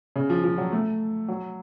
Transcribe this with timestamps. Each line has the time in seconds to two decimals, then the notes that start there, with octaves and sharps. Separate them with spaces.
0.16 C#3
0.30 F3
0.44 F3
0.58 F#3
0.72 A3
1.28 F#3